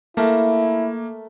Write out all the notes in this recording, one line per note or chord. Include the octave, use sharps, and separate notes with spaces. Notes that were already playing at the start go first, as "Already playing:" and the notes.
A3 A#3 E4 A#4 A5